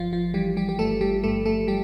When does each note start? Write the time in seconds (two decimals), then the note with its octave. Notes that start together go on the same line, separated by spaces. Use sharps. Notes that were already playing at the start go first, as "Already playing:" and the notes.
Already playing: G1 F3 F4
0.13 F3 F4
0.34 E3 G3 G4
0.56 G3 G4
0.69 G4
0.79 G1 A3 A4
1.01 G3 G4
1.23 G2 A3 A4
1.45 A3 A4
1.67 G3 G4